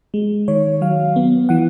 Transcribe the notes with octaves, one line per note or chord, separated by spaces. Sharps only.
G#3
D#3 C#5
F#3 F5
B3
E3 F#5